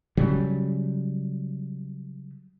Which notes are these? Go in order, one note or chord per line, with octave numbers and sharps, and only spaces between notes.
C#3 F#3 G3